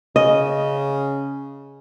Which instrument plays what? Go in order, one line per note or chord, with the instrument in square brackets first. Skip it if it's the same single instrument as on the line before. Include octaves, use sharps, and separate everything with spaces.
[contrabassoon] C#3 [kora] D#5